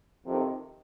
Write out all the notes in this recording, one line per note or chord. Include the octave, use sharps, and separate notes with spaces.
F2 C3 D#3